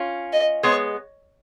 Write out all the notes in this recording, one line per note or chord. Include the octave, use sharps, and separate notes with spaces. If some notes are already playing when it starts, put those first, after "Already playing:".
Already playing: C#4 F4
D#5
G#3 B3 C#5